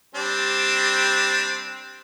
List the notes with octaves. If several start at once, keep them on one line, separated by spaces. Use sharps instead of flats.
G3 C4 D4